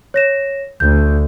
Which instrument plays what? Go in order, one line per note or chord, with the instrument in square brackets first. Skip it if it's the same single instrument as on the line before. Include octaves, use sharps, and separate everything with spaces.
[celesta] C#5 A#6 E7
[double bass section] D2 [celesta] G6